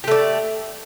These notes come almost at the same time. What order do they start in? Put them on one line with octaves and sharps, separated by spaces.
G4 A3 D5